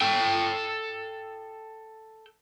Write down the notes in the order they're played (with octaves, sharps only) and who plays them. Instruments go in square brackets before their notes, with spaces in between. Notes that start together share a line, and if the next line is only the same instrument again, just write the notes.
[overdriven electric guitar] A4 G5